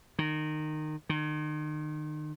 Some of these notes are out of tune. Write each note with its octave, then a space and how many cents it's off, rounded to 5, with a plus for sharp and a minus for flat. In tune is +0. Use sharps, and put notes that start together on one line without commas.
D#3 -20
D#3 -35